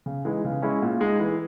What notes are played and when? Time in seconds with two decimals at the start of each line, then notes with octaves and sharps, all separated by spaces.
0.06 C#3
0.25 E3 G#3 D#4
0.45 C#3
0.62 G#3 C#4 E4
0.82 A#2
1.00 G#3 D#4
1.20 E3